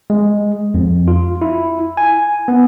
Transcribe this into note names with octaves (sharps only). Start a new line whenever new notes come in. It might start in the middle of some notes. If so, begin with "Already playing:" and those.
G#3
F2
F4
E4
G#5
B3